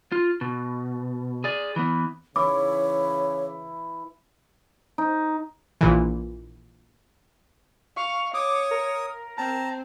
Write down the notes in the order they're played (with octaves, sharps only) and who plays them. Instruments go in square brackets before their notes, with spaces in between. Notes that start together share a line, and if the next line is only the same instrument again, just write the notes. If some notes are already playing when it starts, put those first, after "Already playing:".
[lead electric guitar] F4
B2
G#4 D5
E3 B3
[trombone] C#3 [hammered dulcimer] E3 E4 [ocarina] C#5 [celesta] D6
[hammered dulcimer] D#4
[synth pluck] A#1 A#2 E3
[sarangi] F5 [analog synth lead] C#6
[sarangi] C#5 [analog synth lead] D6 [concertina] D#6
[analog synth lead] A#4
[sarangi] C4 [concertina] A5 A#5